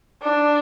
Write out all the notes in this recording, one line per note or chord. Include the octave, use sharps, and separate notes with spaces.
D4